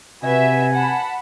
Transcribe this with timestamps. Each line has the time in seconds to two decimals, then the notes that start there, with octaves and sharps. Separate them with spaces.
0.23 C3 F#4 B4 E5 G#5
0.74 F#5 A5 B5